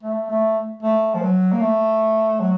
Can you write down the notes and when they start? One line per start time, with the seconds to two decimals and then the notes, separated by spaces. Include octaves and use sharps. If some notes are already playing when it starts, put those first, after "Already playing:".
0.03 A3
0.30 A3
0.83 A3
1.15 F3
1.22 F#3
1.52 A#3
1.61 A3
2.40 F#3